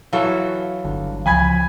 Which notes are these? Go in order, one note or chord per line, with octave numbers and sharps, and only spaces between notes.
E3 F#3 A4 F5
G1 D3
C#2 F3 G#5 B5 G#6